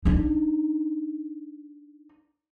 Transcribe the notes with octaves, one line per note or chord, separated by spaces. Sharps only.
D4 D#4